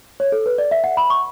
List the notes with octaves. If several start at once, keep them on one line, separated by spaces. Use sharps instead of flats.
C#5
A4
B4
D5
E5
F#5
B5
C#6